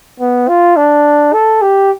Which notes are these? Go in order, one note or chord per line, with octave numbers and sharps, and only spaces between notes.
B3
F4
D4
A4
G4